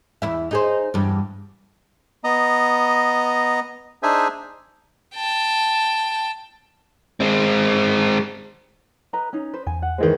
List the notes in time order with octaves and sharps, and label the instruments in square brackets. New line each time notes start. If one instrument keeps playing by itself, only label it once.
[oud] E2 E4 E5
D#4 G#4 C5
E2 G2
[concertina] B3 D#5 A#5
D4 D#4 G#4 C5 E5 G#5
[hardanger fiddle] G5 A5
[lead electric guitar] G#3 C4
[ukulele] B4 D#5 A#5
C#4 D#4
B4 C5
[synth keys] E2 [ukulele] G#5
[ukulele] F#5
[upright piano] D#3 E3 G#3 [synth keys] C5 D#5 C#6